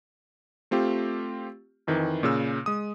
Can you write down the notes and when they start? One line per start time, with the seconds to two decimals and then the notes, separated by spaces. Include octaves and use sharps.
0.71 A3 C4 F4 G4
1.87 F2 D#3 E3
2.23 A#2 C#3 E6
2.66 G#3 D#6